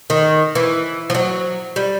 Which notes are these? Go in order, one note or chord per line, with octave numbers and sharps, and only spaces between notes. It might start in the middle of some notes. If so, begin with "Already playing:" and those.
D#3
E3
F3
F#3
G3